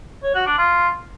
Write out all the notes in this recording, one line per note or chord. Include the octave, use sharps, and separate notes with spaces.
C#5
F#4
D4
F4